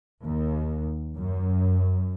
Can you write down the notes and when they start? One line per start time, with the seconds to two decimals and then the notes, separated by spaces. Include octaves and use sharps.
0.24 D#2
1.16 F#2